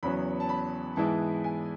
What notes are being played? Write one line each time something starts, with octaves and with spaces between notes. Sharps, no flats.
E2 C#3 F#3 B3 B5
A5
B5
G#2 E3 G#3 B3 E4 A5
G#5